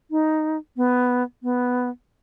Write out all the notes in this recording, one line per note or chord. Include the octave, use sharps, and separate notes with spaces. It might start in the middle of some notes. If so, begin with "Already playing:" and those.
D#4
B3
B3